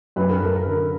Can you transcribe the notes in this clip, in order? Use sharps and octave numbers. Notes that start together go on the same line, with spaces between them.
F#2 B4
A#4
F#2 A4
A#4
D3